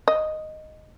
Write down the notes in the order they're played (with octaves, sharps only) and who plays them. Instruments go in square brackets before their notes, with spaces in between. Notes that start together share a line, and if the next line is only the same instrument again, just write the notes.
[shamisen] D#5